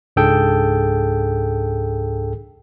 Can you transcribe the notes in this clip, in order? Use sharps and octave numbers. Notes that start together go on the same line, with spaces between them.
C#2 G#2 D4 G#4 A4 G5